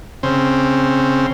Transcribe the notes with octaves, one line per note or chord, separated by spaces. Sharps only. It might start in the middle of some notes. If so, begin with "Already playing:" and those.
C#3 C4